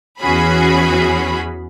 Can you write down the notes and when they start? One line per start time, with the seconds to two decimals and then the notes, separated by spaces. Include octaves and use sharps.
0.20 E2 E3 C#4 F#4 G#4 B5